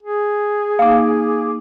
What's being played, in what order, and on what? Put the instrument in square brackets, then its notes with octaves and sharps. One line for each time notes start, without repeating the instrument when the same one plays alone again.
[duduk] G#4
[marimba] A#3 D#4 [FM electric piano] F5 D6